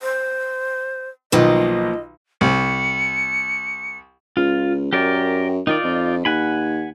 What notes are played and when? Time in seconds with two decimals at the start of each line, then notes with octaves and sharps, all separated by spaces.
0.01 C5
1.32 B1 D#3 F3 A#3 B4 D#5
2.41 C2 C#7
4.37 C#2 F4
4.93 F#2 G4 A#4 D5
5.67 D#3 D#4 F4 D5
5.84 F2
6.25 D#2 F#5 G#5 B5